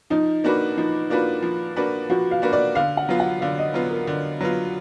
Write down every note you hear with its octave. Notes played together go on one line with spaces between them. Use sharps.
F3 D#4
A#3 D4 F#4 B4
F3 D#4
A#3 D4 F4 F#4 B4
F3
A#3 D4 F#4 B4
F3 F#4
F5
A#3 D4 F#4 B4
D5
D3 F5
F#5
F#3 B3 F4
F#5
D3 F5
D#5
F#3 B3 F4
A#4
D3
F#3 B3 F4